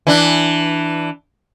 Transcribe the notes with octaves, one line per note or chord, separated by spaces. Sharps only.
E3 D4